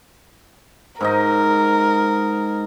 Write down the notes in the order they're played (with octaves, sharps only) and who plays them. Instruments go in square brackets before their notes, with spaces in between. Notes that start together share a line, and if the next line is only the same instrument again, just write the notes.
[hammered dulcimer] G#2 D#4 D#5 [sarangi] A#4